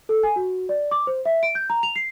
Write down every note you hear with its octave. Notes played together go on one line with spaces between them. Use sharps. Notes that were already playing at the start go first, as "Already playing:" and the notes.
A4
G#5
F#4
D5
D6
C5
E5
D7
G6
A#5
F7
C7